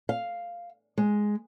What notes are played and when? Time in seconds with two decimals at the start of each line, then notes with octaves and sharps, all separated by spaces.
0.09 F5
0.98 G#3